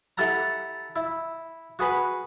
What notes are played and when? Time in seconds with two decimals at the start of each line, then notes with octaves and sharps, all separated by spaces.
0.18 E4 G4 A4 F#5 A#5
0.96 E4
1.79 F#4 G#4 B4 B5